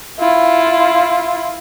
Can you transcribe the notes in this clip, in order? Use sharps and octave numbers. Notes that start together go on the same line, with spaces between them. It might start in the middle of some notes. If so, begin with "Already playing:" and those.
E4 F4